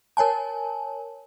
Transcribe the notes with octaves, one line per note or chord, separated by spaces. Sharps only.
A#4 C#5 G#5 A5